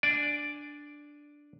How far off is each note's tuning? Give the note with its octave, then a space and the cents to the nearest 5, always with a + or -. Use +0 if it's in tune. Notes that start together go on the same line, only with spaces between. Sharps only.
D4 +0 D5 +0 G#5 +0